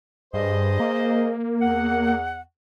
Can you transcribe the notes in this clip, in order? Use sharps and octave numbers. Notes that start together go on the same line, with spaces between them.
G2 G#4 C5 D#5
A#3
E2 F#5